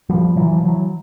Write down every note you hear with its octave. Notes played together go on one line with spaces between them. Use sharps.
F3 G3
E3 F#3
F3
E3 F#3